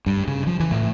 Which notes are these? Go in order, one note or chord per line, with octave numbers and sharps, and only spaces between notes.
G2
C#3
F3
E3
A2